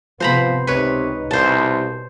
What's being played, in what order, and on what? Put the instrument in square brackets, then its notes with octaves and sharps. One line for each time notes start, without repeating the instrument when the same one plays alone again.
[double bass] C3 B3 [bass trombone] F3 [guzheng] C5 A#5 B5
[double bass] C#2 D#4 [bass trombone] C3 [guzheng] B4 C#5
[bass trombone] C2 [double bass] B2 [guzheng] C5 A5